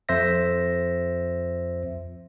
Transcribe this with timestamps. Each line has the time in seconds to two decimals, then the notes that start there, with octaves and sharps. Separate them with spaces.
0.09 F2 C5 E5 A#6